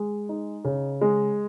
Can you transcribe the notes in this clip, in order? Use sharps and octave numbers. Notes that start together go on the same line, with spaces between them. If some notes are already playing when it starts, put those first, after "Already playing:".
Already playing: G#3
D#4
C#3
G#3